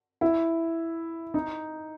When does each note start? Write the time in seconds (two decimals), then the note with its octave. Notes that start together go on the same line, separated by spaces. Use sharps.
0.21 E4
1.34 D#4